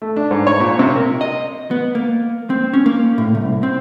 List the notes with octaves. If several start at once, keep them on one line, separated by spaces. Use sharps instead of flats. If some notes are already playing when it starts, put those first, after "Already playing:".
A3
D4
G#2
C#5
A#2
C3
A#4
D#5
B3
A#3
C4
C#4
A#3
A2
C2
C4